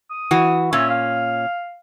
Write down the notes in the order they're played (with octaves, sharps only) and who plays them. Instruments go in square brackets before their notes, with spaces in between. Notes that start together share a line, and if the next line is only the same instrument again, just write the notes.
[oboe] D#6
[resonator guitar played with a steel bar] E3 F#4
[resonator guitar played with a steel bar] A#2 C#4 [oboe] E5
[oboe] F5